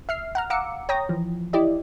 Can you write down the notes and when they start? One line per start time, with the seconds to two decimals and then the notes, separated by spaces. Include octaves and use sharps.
0.09 E5 F6 C7
0.35 F#5 A#5 F6
0.50 F5 F#5 A#5 D6 E6 C#7
0.89 C#5 G5 A#5 D#6 A#6
1.09 E3 F3
1.53 E4 G4 D5 D#5